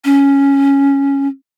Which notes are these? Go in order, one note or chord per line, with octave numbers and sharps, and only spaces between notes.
C#4